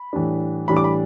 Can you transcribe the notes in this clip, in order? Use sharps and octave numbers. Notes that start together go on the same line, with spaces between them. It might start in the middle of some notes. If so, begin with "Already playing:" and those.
Already playing: B5
A2 E3 G3 D4
A2 E3 G3 D4 B5
D6
B5